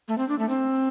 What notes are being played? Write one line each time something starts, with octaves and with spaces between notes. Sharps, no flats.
A3
C4
D4
A3
C4